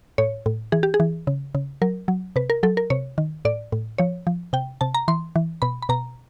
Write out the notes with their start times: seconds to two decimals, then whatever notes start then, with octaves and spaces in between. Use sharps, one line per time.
0.18 A2 C#5
0.46 A2
0.72 E3 G#4
0.83 G4
0.94 G#4
1.00 E3
1.27 C#3
1.55 C#3
1.82 F#3 A#4
2.08 F#3
2.36 C3 B4
2.50 A#4
2.63 F#3 A4
2.77 A#4
2.90 C3 C#5
3.18 D#3
3.45 A2 D5
3.72 A2
3.98 F3 C#5
4.27 F3
4.53 C3 G5
4.81 C3 A5
4.95 A#5
5.08 E3 C6
5.36 E3
5.62 B2 B5
5.82 B5
5.89 B2 A#5